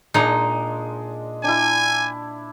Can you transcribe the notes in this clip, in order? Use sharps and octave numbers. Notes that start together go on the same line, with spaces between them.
A#2 G#3 D4 D#4
D4 E4 G#5